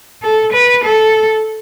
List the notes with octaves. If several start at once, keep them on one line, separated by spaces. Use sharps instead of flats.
A4
B4
A4